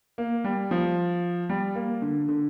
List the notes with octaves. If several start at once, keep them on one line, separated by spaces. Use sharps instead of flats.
A#3
G3
F3
G3
A#3
D3
D3